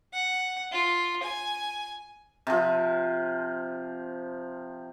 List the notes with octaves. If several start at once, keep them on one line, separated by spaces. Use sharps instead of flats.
F#5
F4
G#5
C3 F3